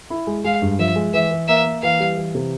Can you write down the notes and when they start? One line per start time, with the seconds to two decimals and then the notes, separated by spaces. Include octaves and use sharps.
0.10 E4
0.27 G#3
0.44 G#3 F5
0.62 G2
0.79 F3 E5
0.96 G#3
1.13 E3 E5
1.31 E3
1.48 A#3 E5
1.66 A#3
1.82 E3 F5
2.00 G3
2.18 E3
2.35 C3